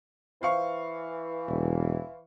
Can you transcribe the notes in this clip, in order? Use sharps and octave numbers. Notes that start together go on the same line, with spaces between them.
E3 C5 F5 C#6
E1